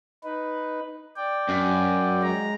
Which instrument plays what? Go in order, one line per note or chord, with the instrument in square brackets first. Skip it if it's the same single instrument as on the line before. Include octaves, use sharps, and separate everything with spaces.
[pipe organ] D#4 B4
D5 G5
[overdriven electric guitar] F#2
[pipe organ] G#3 A#5